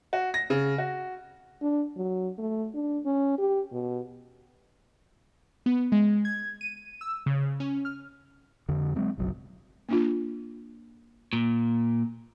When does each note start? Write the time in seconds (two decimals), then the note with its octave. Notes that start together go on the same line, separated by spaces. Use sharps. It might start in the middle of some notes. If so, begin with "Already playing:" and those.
0.13 F#4
0.34 A#6
0.50 C#3
0.78 F#4
1.62 D4
1.96 F#3
2.38 A3
2.74 D4
3.05 C#4
3.38 G4
3.72 B2
5.66 B3
5.92 G#3
6.25 G#6
6.61 D#7
7.01 E6
7.26 C#3
7.60 C#4
7.85 F6
8.69 F2 D3
8.96 F#3 G#3 C4
9.18 F#1 B1 F#3
9.89 A#3 D4 F4
11.33 A#2